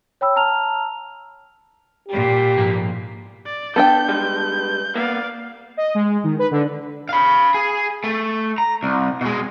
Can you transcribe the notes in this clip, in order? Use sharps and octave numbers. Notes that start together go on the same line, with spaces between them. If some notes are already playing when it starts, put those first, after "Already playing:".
C#5 G5 B5 E6
A5 A#5 F6 F7
A#2 G3 G4
G#2 F3 A#3
D5
B3 D4 A4 G5 G6
G2 G3 G#3
A#3 B3 D5 F5
D#5
G#3
D#3
B4
D3
F5 B5
G#4
A3
A#5
C2
B2 G#3